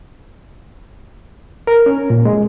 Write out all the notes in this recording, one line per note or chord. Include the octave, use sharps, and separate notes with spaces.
A#4
C#4
A#2
G#3